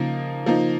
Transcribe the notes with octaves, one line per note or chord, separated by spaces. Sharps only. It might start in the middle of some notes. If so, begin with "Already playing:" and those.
Already playing: C#3 F3 A#3 D#4
F3 A#3 D#4